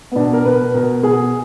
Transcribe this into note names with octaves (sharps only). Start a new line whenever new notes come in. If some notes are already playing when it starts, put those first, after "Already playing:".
B3
B2 D4
A#4
B2 B4
B2 A#4
B2 G#4